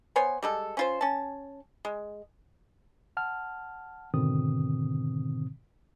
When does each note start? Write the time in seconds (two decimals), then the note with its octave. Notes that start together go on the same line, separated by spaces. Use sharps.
0.16 B3 C5 C#5 G#5
0.43 G3 G#3 A4
0.77 C#4 F4 C5
1.01 C#4 A5
1.85 G#3
3.17 F#5 A5 F6
4.14 G#2 B2 D3 D#3 C4 D#6